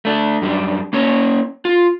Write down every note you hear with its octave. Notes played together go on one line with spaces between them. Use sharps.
A3 D4
F#2 G3 D4
A#3 C#4 C#5
F4